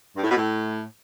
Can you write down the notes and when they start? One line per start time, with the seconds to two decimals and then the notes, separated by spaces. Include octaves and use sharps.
0.16 G2
0.23 A2
0.29 B2
0.36 A2